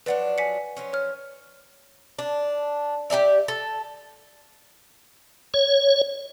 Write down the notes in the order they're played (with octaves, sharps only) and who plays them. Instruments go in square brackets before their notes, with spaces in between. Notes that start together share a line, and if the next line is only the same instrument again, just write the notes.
[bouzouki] F3 F#3 D4 [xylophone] B4 D5 F#5
[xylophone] G#5 B6 C#7
[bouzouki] F3 F#3 C#4
[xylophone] C#5 F6
[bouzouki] D4
G4 A4 D5 E5
A4
[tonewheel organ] C#5